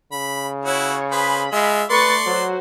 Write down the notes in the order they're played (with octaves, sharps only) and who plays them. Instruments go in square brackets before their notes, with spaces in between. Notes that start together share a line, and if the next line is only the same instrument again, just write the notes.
[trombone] C#3 [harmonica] B5
[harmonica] E4 F#4 [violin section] C#5
[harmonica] G#4 B4 C5 [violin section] B5
[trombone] G#3 [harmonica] F4 E5
[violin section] A3 C#6 A6 [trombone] B4 [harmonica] D5 C6
[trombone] F#3 [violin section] F#4 C5